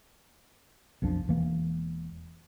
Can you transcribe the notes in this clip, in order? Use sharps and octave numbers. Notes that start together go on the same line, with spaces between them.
B1 F2 F3 D4
E1 E3 A#3